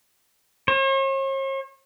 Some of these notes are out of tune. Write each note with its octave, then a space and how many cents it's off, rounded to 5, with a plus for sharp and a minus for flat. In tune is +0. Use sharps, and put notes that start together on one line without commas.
C#5 -45